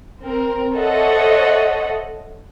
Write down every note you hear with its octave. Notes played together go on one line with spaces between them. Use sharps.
C4 A#4
A4 C5 C#5 D#5 E5 F#5